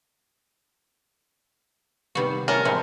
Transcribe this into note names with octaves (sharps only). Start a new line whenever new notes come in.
C3 D#3 G3 B3 F#4
C#4 A#4 D5 A5
G3 G#3 C4 E5 A5 C6